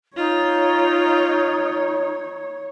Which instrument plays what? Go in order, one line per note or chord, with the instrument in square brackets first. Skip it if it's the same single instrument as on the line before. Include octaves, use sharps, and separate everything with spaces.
[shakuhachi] D#4 [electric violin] F4 [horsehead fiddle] C#5